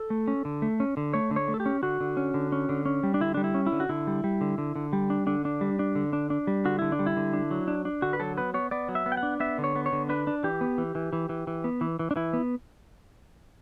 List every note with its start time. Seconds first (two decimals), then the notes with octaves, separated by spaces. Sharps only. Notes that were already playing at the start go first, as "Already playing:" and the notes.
Already playing: A4
0.10 A3
0.28 C#4
0.45 D3
0.62 A3
0.80 C#4
0.97 D3
1.14 A3 C#5
1.31 D3
1.36 C#5
1.48 A3
1.54 A4
1.60 G4
1.66 C#4
1.83 D3 F#4
2.01 D3
2.17 C#4
2.34 D3
2.52 C#4
2.69 D3
2.86 C#4
3.03 G3
3.14 D4
3.21 D3 E4
3.34 G3 D4
3.44 E4
3.54 C#4
3.66 E4
3.72 D3
3.80 F#4
3.89 D3 E4
4.07 G3
4.24 G3
4.41 D3
4.58 D3
4.76 D3
4.93 G3
5.10 D4
5.27 D3 D4
5.45 D4
5.61 G3
5.79 D4
5.96 D3
6.13 D4
6.30 D4
6.47 G3
6.65 D3 F#4
6.79 D3 E4
6.92 D4
6.99 G3
7.06 E4
7.17 D3
7.33 D4
7.51 F#3
7.68 D4
7.85 D4
8.02 D3 F#4
8.13 B4
8.20 F#3 A4
8.38 B3 B4
8.54 B3 C#5
8.71 B3 D5
8.89 F#3
8.95 E5
9.06 B3
9.12 G5
9.17 F#5
9.23 D4
9.40 B3 E5
9.58 D3
9.64 C#5
9.76 B3
9.86 C#5
9.92 D3
10.09 D4 B4
10.27 D4
10.43 E3 G4
10.61 B3
10.78 E3
10.95 E3
11.13 E3
11.29 E3
11.47 E3
11.64 B3
11.81 E3
11.99 E3
12.11 D4
12.16 E3 E4
12.33 B3